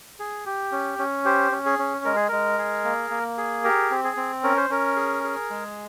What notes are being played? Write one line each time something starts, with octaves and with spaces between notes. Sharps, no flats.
G#4
G4
C#4
C#4
G4 C5
C#4
G#4
C#4
G#3 A#4
G#4
G#3 A#4
G#4
A#3
A#3
G#4
G4 A#4
C4
G#4
C4
C#4 A#4
C5
C#4 A#4
G#4
G#4
G#3